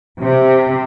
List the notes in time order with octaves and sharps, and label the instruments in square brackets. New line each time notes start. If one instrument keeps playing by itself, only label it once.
[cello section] C3